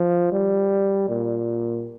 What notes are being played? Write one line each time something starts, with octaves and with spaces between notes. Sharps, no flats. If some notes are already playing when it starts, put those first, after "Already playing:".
Already playing: F3
G3
A#2